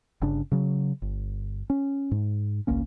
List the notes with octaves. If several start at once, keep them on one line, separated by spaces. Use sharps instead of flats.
G1 C#3 D4
C#3 F#3
G1
C#4
G#2
G#1 C#2 A#3 C#4